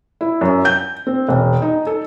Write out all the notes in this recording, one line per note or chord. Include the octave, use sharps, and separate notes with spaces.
E4
F#2
G6
C4
E1
D#4
A4